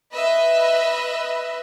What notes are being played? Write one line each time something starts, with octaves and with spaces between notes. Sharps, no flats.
B4 D#5 E5